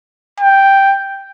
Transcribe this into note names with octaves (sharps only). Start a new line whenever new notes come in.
G5